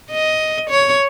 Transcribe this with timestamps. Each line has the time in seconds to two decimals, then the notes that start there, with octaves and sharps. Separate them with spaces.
0.11 D#5
0.70 C#5